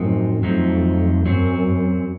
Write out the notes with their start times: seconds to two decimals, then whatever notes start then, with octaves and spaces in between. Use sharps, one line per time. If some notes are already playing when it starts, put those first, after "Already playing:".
Already playing: F#2 A2 F3 C4 D#4 F#4
0.43 F2 F#3 A3 C4 D#4
1.26 F#2 F#3 C4 F#4